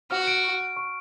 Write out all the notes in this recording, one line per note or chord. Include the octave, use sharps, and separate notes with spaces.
F#4 F6
D7
C#6
D7
C#6